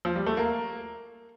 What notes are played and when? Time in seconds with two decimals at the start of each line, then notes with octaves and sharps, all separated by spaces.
0.05 F3
0.16 G3
0.26 A3
0.37 A#3 A#4 F5 A#5